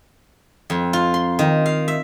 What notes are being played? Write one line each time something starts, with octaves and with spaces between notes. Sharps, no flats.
F2
F4
C6
D#3
F5
E5